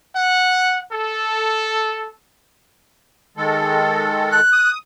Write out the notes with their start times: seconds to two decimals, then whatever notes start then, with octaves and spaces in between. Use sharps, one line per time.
0.15 F#5
0.90 A4
3.37 D#3 G#3 A4
4.32 F#6
4.53 D#6